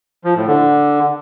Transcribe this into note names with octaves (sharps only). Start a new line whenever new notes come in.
F3
A2
D3